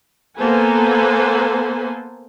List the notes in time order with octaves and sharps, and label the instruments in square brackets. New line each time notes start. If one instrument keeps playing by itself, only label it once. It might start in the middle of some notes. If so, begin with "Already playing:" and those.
[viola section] A#3 B3 A4 B4 C5 G#5